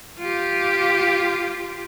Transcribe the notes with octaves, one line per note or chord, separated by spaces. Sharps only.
F4 G4